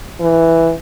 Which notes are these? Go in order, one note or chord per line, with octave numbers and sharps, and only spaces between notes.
E3